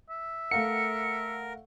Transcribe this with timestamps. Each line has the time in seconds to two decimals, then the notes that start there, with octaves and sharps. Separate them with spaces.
0.10 E5
0.51 A3 A#4 F5 F#5 C#7